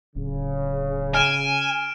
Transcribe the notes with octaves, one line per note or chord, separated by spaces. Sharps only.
D1 C#3
G#5 F6 D7 E7